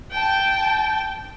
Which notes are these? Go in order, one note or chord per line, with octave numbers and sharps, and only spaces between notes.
G5 A5